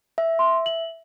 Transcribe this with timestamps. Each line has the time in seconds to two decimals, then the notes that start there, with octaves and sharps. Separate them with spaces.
0.18 E5
0.39 C6
0.66 F#7